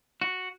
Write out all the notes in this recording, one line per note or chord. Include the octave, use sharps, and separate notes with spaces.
F#4